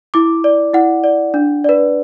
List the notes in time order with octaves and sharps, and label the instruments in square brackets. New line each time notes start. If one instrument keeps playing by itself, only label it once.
[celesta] E4 D6
D5
E4 F#5
D5
D4
B4 D5